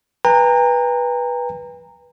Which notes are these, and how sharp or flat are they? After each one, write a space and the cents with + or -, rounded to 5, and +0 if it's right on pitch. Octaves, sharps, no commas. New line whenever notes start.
B4 -15 G5 +45 A#5 -20